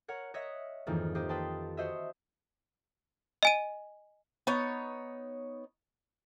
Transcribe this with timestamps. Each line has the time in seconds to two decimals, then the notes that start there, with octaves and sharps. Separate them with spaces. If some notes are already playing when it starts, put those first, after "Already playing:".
0.08 A#4 C#5 F#5
0.34 C#5 D#5 E5 F#6 A#6 B6
0.87 F2 G#2 D#3 E3 A#3
1.15 A#3 G4 C5 D#5
1.29 B4 D#5 G5 A5 C6
1.77 F#4 C5 D#5 E5
3.43 D#5 G#5 D#7
4.47 B3 D#4 C#5